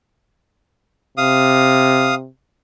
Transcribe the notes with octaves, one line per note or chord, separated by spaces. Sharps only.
C3 F5 D#6